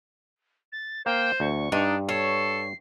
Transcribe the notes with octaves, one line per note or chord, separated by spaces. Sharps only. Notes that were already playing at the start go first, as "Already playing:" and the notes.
A6
A#3 C5 F5 G5
D2 C#6
G2 D4 D#4
A4 C#5 C7